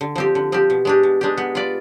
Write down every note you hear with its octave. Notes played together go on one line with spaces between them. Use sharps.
D3
F3 C4 G4
D3
F3 C4 G4
B2
G#3 D4 G4
B2
G#3 D4 G4
B3
F4 B4 D5